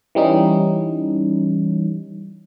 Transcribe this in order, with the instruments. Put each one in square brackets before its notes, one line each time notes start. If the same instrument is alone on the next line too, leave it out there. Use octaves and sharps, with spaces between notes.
[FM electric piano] E3 G3 C#4 D#4